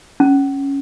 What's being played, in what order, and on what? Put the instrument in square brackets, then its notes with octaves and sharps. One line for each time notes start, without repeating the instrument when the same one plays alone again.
[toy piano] C#4